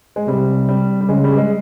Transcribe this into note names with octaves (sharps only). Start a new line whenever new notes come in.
G#3
C3 G3
G3
G3
C#3 G#3
G3
G#3